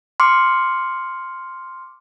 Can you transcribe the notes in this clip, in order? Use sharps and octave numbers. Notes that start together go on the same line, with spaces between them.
C6 D6 F6 C#7